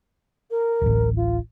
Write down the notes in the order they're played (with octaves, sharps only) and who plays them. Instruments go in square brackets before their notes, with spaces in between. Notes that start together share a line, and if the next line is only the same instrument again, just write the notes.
[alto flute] A#4
[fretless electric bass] D1 A1
[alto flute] F4